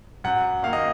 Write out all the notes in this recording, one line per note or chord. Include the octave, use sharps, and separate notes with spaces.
F#2 F#5
D#3 A#3 F5
D#5